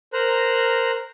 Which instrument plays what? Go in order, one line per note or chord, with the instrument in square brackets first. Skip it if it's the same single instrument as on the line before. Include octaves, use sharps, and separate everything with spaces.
[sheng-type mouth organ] A#4 C5 A#5 F#6